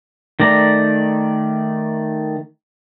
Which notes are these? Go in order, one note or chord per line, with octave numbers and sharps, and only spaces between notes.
D#3 A3 D5 A#5